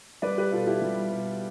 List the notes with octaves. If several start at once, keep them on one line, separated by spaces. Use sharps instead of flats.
G3 B4 D5
G4 B4
B2 F4 A4
E4 G4
G3
B2